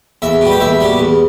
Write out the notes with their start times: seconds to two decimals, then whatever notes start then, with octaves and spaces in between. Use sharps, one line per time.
0.22 E2 E5
0.41 B2 G3
0.52 G5
0.60 E2 E5
0.80 B2 G3
0.99 E2